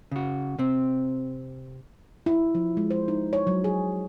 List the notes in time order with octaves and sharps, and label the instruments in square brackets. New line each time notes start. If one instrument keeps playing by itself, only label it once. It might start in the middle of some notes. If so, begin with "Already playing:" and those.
[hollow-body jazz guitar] C#3 F#4
C3 C4
[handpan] E4
F3
G#3
C5
D#4
C#5
F#3
G#4